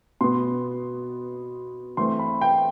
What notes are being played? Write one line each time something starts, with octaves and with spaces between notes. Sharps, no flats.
B2 B3 C6
E3 A3 C4 C6
B5
G5